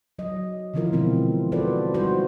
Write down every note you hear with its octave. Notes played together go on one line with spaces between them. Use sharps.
F#3 D#5
D3 E3 F3 E4 F4 A#4
B2 G#3 B3 C4 E4
F4 F#4 A4 B4 C5 D5
G3 D#4 F#4 C5